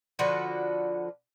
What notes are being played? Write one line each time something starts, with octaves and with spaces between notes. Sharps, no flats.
D3 F3 F#4 B4